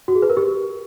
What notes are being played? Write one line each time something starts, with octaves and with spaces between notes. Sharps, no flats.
F#4
G#4
B4
A#4
G4